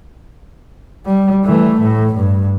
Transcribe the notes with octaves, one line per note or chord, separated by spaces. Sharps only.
G3
E3 A3
A2
G2